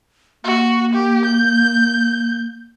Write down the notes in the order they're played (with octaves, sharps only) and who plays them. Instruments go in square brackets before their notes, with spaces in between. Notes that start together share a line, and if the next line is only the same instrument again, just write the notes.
[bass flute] A#3 [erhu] F#4
[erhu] G4
G6